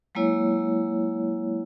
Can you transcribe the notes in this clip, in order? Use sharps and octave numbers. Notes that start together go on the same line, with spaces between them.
F#3 G#3 A#3 E4 C#5